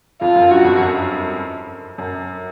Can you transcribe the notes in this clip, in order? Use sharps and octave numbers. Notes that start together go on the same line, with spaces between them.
F2 F4
F#2
G2 F#4
F2
F#2
F#2